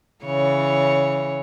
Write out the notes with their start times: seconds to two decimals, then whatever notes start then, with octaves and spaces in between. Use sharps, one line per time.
0.25 C#3 E3 C#5